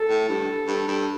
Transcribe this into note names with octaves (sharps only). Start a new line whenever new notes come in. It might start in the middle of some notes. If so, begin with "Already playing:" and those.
Already playing: A4
A2
G2
G2
G2